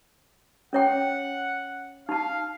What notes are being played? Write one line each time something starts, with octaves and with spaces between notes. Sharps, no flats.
C#4 C#5 F#5 G5
D#4 F5 A5